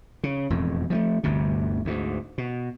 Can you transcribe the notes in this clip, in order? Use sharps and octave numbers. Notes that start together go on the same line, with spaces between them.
C#3
E1 F2 A2
F3 G3 A3
G1 D2 G2 C3
D2 G#2
B2